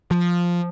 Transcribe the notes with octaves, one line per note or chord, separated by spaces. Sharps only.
F3